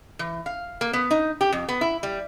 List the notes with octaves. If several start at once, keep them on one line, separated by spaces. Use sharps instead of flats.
E3
F5
A#3
B3
D#4
G4
F2
B3
E4
G3